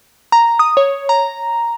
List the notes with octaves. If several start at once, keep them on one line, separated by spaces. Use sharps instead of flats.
A#5
D#6
C#5
A#5